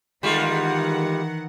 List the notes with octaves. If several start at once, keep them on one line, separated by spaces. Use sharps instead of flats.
D#3 E3 G3 G#3 F4 F#5